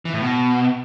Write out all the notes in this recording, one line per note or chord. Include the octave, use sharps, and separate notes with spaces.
E3
A2
B2